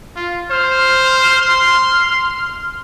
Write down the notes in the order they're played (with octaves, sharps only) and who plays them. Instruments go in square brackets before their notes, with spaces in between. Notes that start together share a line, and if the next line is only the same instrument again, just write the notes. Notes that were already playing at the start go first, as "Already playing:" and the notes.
[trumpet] F4
[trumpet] C5 [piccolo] F6
[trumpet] C6